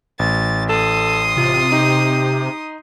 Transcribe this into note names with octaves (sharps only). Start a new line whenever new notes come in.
A1 A6
A4 C6 D#6
C3 F4
D#4 G4